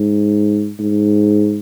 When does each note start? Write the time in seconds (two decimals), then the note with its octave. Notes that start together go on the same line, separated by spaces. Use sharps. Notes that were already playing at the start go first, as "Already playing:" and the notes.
Already playing: G#2
0.79 G#2